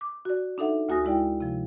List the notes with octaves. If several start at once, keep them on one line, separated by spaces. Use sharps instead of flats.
D6
F#4 D5
D4 D#4 A4 E5 F#5
D2 A#3 F#4 G#5 D#6 A#6
G#3 E4 D5 G5
C3 F3